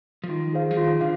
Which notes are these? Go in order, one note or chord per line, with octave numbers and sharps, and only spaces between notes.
F3
D#3 F4
G#4 C5 F5
F3
D#3 F4
D3 F5